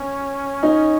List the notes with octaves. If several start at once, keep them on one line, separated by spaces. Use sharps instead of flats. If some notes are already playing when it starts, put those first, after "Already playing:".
Already playing: C#4
D#4